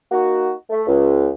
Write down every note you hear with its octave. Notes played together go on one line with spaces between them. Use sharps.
A#3 D#4 F#4
A3
C#2